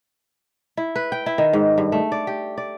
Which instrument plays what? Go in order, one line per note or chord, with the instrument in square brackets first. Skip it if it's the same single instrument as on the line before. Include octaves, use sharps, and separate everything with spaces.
[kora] E4
B4
G5
E4
D#3
G#2
G2
A3
D5
G4
D5